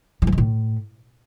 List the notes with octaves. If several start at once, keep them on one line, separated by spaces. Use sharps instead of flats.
D#3
F3
D#3
A2